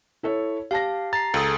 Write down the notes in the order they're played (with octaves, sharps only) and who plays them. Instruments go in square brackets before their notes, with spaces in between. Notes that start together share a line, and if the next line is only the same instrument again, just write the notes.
[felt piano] E4 A4 C#5
[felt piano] G4 A5 A#6 [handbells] F5
[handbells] A#5 C7 [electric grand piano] A6
[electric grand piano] C#2 [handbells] G#4 A4 D#6